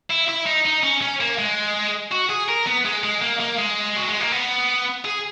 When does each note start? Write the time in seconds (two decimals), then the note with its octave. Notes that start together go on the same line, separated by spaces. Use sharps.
0.11 E4
0.29 E4
0.46 D#4
0.66 D#4
0.84 C#4
1.01 C#4
1.21 A#3
1.39 G#3
2.11 F#4
2.30 G#4
2.48 A#4
2.66 B3
2.85 G#3
3.04 G#3
3.22 A#3
3.40 A#3
3.58 G#3
3.96 F#3
4.08 G#3
4.20 A#3
4.32 B3
5.05 G#4